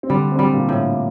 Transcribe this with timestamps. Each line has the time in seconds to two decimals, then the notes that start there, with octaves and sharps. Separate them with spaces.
0.03 C4
0.10 D3 G3 D4
0.32 C3 C4
0.39 G3
0.54 A#2 A#3
0.69 A2
0.76 A#2 A#3